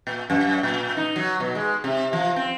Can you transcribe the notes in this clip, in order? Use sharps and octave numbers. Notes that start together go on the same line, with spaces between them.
A#2
F#2
A#2
D#4
F#3
B2
G#3
C3
F3
C4